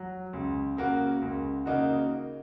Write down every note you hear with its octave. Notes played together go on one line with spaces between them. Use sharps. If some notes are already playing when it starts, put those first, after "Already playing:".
Already playing: F#3
C#2
C#3 A#3 F#4
C#2
C#3 A#3 D#4 F#4